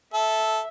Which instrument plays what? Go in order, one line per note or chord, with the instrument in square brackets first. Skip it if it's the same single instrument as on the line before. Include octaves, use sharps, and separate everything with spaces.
[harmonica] A4 [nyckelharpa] E5